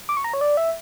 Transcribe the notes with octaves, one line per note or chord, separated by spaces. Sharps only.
D6
C#6
A#5
C#5
D5
E5